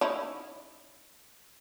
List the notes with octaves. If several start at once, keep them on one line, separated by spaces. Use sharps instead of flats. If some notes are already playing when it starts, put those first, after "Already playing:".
C#4 D#4 E4